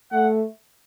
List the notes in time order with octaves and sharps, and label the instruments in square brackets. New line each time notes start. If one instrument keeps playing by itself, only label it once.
[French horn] A3 [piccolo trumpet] F#5